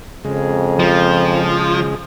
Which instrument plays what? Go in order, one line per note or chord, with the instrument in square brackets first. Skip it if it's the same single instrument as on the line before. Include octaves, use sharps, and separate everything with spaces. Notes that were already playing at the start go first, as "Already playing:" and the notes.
[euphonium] F2 [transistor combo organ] C#3 G#3
[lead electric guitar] F3